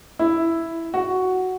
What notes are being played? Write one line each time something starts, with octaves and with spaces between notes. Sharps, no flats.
E4
F#4